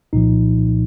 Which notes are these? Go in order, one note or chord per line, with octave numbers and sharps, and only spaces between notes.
C2 A#2 F3 D#4